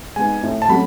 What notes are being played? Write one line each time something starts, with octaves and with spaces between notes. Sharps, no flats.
G#3 B3 D#4 G#5
A2
A5
F#3 A3 C#4 F#4 B5